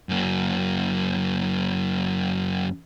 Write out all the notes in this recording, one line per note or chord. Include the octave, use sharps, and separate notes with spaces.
F#2 A#3